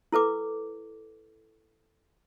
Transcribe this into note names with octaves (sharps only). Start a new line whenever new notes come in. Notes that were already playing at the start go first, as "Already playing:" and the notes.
E4 A4 B4 D6